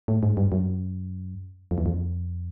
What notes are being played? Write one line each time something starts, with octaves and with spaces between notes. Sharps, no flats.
A2
G#2
G2
F#2
F2
E2
F2